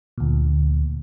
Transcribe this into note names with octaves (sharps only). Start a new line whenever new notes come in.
D2 A#2